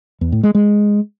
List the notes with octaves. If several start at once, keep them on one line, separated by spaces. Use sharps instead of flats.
E2
A2
G#3
G#3